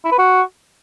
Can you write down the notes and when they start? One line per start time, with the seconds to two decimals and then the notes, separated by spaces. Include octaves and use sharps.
0.04 E4
0.11 B4
0.19 F#4